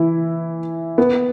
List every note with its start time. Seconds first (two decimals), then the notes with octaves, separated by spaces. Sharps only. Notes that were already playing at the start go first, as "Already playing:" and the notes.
Already playing: E3 E4
0.98 B3